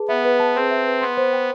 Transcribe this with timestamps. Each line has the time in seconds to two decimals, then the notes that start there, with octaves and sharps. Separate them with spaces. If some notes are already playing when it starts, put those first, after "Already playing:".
Already playing: G#4 B4 A5
0.09 B3 E5
0.25 B4
0.40 A5
0.55 C4 G#4
0.71 E5
0.86 B4
1.01 B3 C6
1.17 C5
1.33 G5